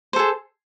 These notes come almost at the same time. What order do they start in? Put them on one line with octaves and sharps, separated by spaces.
C5 A4 G#4